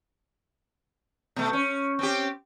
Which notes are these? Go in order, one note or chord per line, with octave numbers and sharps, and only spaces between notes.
B2 A3
C#4
C4 C#4 G4